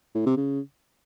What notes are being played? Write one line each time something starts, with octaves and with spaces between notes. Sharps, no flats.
A2
C3
C#3